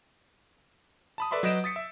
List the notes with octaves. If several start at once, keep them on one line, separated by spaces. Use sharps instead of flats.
A5 B5 D#6
A4 B4 D5 E5 B5 C6
F#3 B4 D#5 G6 D7 E7
D#6 A6 B6 C#7
E5